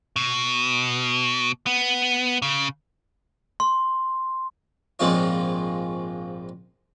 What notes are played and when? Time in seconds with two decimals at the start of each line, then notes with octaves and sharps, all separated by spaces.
0.16 B2
1.66 B3
2.42 C#3
3.60 C6
4.99 A#1 G#2 G#3 C4 F4 C#5